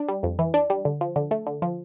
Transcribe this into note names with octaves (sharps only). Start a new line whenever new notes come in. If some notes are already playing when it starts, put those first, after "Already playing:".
Already playing: D4
G3
F2
E3
D4
G3
D3
F3
D3
A3
D3
F3